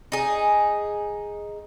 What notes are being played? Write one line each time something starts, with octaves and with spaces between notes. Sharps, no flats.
D#4 G#4